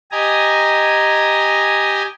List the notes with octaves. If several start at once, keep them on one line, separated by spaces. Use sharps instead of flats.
G4 D#5 G#5 A#5